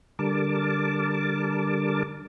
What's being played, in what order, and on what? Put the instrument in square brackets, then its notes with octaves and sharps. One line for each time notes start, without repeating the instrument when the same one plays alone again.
[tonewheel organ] D3 G3 A#4 A5 D6